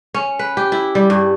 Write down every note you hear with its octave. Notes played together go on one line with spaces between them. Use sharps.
C#4
B4
G4
E4
G3
G2